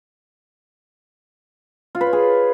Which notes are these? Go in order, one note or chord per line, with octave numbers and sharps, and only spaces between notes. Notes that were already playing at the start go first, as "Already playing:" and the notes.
F4
B4
C#5
G#4